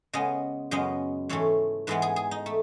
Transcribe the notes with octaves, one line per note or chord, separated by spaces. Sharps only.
C#3 G#3 B3 D#5
F#2 C#3 G#3 B3 D#5
G#2 E3 A3 C#5
G#2 E3 G#3 B3 B4
G#4
G#4
D#4
A3